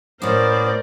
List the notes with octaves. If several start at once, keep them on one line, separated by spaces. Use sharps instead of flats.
A2 B3 C#4 E4 A#4 C5 D5 D6